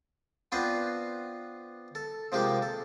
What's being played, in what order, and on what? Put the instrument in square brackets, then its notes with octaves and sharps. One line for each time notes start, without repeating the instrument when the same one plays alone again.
[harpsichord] B3 C4 D4 F4 B4 C5
A4
C3 F3 G#3 A#3 G4
A4